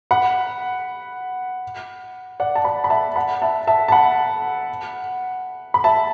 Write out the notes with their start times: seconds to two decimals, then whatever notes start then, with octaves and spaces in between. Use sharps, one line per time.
0.11 F#5 B5
2.40 D5 F#5
2.56 A5
2.65 F#5 B5
2.84 B5
2.90 E5 A5
3.16 F#5 B5
3.42 E5 A5
3.67 E5 A5
3.88 A5
3.92 F#5 B5
5.74 B5
5.84 E5 A5